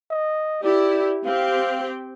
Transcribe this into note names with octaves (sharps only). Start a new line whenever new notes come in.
D#5
E4 G4 D5
C4 G4 F5 G5